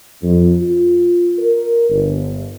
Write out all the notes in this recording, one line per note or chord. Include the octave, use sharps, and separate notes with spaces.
F2
F4
A#4
G1